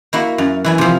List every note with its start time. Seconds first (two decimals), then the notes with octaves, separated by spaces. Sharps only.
0.13 A#3 E4 F#4
0.38 F#2
0.64 E3 E4 G#5
0.78 C3 F3